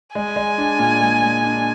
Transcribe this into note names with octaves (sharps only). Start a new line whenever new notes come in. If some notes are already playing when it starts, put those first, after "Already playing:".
G#3 G#5
G#3
D4
A#2
G#3
G#3
D4